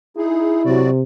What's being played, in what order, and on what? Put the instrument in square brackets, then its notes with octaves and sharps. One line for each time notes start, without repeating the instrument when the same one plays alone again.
[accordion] D#4 G#4 [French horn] E4
[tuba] C3 [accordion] F#3 F#4 D5